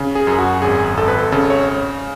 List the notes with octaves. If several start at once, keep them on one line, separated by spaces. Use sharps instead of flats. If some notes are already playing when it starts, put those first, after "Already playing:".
Already playing: C#3
G#4
F#2
F#4
G#1 G#4
G#1 A4
B4
A4
C#3 A4
C#5